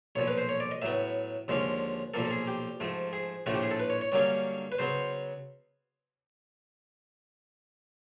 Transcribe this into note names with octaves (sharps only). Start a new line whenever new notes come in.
B1 A#2 F3 C#5
B4
C5
C#5
D5
D#5
A2 F#3 B3 E5
D#2 D3 F3 G#3 C#4
B1 A#2 F3 A#3 A4
A4
G#4
G4
G#2 F3 A3
G#4
A#1 A2 F3 A3 F#4
G4
G#4
A4
B4
C#5
C#5
G2 D3 F#3 A#3 C#4 C#5
B4
C#3 F#3 B3 C5